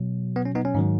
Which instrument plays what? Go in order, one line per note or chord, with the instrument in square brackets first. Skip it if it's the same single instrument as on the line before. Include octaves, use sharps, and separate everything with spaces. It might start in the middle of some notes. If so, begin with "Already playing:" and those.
Already playing: [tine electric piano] B2 F#3
B3
C#4
B3 D#4
C#4
G#2 D#3 F#3